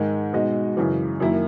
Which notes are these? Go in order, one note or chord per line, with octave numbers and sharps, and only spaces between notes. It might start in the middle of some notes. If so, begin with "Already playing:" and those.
Already playing: G#2 D#3 G#3
B2 G#3 D#4 F#4
F#2 C#3 E3
F#2 D#3 A#3 E4